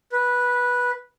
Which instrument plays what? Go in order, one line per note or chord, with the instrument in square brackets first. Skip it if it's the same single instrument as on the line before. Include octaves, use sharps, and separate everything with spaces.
[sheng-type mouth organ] B4